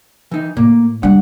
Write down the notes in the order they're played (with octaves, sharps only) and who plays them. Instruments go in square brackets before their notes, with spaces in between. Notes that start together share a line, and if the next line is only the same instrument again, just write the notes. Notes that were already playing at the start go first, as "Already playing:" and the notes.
[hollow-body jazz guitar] E3 D#4
[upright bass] A2 [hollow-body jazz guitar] A#3
[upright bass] G3 D4 [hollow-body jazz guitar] F#5